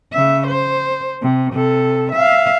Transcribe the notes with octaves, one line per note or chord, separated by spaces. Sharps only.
C#3 E5
C5
C3
C3 A4
E5 F5